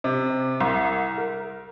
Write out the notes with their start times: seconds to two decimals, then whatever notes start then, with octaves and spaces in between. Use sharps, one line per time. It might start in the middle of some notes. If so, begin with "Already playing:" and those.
0.04 C3
0.61 C2
1.17 A#4